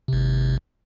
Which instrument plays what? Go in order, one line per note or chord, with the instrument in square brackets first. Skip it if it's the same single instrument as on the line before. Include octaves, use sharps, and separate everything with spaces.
[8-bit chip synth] G#1 C3